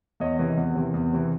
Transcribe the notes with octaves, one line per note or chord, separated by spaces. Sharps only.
E2 C#5 D#5
C3 E3
E2
C3 E3
E2
C3 E3